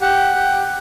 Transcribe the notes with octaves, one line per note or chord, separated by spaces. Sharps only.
G4 F#5
G4